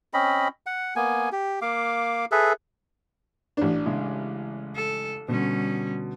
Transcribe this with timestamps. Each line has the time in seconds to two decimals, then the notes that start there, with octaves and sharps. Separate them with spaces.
0.14 C4 C#4 D#5 B5
0.66 F#5
0.96 A#3 B3 G#5
1.32 G4
1.62 A#3 F5 D6
2.32 G#4 A4 B4 E5
3.57 A1 D4
3.86 C#3 G#3 E4
4.75 A4
5.28 B2 D3 G3 C#4